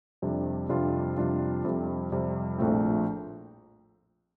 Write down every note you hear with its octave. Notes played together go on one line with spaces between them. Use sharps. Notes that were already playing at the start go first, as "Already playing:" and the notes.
F2 C3 G3 D4
F2 C3 G3 D4 F4
F2 C3 G3 D4 F4
F2 C3 G3
F2 C3 G3
A#1 A2 F3 A3 C4